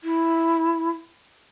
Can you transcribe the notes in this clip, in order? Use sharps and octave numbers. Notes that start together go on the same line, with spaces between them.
E4